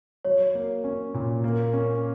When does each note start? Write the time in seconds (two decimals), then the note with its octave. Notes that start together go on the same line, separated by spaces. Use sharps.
0.25 F#3 C#5
0.55 A#3
0.84 C#4
1.14 A#2
1.44 A#3
1.73 C#4